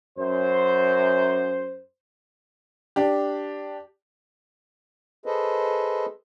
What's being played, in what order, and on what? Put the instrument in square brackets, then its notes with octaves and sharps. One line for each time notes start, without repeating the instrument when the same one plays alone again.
[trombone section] F#2 C5
[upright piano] D4 G4
[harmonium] G#4 A4 B4 C5 D#5